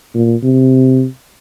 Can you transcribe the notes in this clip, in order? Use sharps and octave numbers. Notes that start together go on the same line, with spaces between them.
A#2
C3